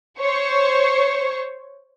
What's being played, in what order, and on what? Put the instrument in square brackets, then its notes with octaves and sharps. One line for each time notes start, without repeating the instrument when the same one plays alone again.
[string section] C5 C#5 C#6